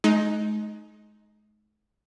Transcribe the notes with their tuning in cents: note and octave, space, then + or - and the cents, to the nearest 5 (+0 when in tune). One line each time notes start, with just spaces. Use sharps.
G#3 +40 D#4 +0